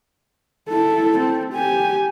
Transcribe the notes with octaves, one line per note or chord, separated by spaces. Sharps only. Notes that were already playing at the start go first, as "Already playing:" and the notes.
E4 A4
C4
G4 G#5